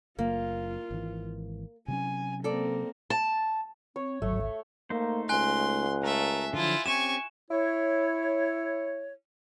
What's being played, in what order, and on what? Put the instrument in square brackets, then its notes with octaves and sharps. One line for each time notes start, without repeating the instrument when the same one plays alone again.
[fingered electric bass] F#1 [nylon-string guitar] A#3 [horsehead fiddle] F4
[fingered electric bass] G#1 E3
[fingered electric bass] C3 F#3 C#4 [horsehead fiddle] G#5
[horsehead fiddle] A#3 C4 [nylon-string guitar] A4 D5
[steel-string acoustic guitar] A5
[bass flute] C4 [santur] C#5
[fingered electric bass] D1 G#1 [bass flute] F#3 [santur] A3
[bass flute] E5
[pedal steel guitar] A3 D#4 C5 [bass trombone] A#3
[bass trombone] C#2 [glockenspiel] G#5 F#6 [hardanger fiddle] C6
[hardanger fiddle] A3 E5 [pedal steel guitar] A#4
[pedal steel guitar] D3 F3 F#3 [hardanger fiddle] E4 F4
[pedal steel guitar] C4 C#4 G4 [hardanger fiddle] G#5 C#6 [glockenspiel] E7
[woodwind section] E4 C#5